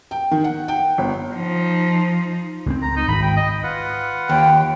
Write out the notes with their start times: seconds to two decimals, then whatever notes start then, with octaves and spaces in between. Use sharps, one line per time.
0.11 G5
0.31 D#3
0.44 F#5
0.68 G5
0.98 G1
1.35 F3 D#4
2.66 C#2 A3 C4
2.82 A#5
2.96 D#4
3.08 G#1 B5
3.22 G5
3.37 D#5
3.63 F4 B4 F#5
4.29 D#2 G5